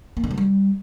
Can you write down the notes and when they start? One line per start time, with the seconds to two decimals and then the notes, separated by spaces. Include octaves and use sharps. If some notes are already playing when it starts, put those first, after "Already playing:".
0.17 A#3
0.24 D3
0.31 F#3
0.38 G3